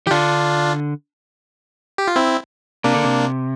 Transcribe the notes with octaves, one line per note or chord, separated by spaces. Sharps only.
E3 G4
D3 D4 F4
G4
F4
C4 E4
C3 A#3 D4
D3
C3